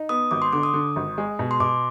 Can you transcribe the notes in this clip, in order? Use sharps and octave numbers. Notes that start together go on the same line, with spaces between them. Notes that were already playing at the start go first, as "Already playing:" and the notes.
Already playing: D#4
B3 D#6
G#1 D6
C6
D3 D6
D#6
D3
G#1
G#3
B2
C6
B2 D6